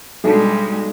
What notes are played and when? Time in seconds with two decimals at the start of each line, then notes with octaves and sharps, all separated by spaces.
0.24 B1 G3 G#3 D4 F#4 A4 D5 A5